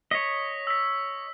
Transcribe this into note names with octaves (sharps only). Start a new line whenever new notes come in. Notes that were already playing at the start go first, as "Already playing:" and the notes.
C#5 D#5 B6
E6 B6